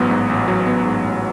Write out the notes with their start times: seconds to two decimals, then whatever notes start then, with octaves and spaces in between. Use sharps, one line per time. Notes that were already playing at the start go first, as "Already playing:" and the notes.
Already playing: A1 G#2 F#3 B3
0.11 G#2
0.30 A1
0.48 F#3
0.67 B3
0.85 G#2
1.04 A1